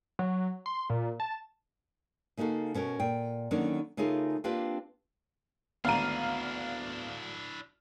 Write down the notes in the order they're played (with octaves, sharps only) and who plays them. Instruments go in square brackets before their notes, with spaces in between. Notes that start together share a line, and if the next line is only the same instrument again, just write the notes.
[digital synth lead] F#3
C6
A#2
A5
[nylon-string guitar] C#3 A#3 D#4 F#4 A4
B2 C#4 F#4 A#4
A#2 G5
D3 D#3 F#3 A#3 C#4 D4
C#3 A3 D#4 F4 G#4 A#4
A#3 C4 D4 F4 G4 B4
[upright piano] G#1 D2 A#5 [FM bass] B3 [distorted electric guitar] D4 E4 [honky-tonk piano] F5 D#7